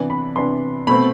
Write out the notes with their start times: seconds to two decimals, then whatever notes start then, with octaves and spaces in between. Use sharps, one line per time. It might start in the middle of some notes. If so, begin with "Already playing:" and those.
Already playing: C3 E3 B3 D4
0.10 B5
0.35 C3 E3 B3 D4 C6
0.87 B2 A3 C4 B5